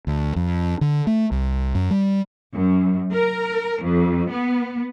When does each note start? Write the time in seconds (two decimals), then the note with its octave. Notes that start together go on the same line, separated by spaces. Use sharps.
0.07 D2
0.36 F2
0.81 D3
1.07 A3
1.31 C2
1.75 F#2
1.91 G3
2.54 F#2
3.12 A#4
3.82 F2
4.31 B3